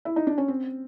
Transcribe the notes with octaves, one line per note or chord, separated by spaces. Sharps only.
E4
D#4
D4
C#4
C4